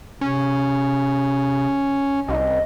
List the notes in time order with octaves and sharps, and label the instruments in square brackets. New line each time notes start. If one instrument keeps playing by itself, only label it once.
[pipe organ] C3 [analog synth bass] C#4
[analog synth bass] C2 [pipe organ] D#5